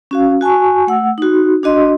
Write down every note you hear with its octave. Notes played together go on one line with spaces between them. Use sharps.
C#4 F#4 F5
F#4 G#5 A5 C#6
A3 F#5 E6
D#4 F#4
D4 F#4 D#5 C6